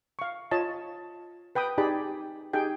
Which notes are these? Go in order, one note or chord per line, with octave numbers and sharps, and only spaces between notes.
F5 C#6
F4 C#5 D#5 A5
B4 G5 B5 D#6
D#4 G4 G#4 D5 B5
D#4 G4 G#4 G5